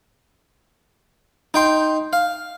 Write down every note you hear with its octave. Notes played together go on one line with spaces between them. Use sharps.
D#4 G5 C6
F5